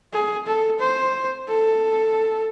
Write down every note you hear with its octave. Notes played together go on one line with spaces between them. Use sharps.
G#4
A4
C5
A4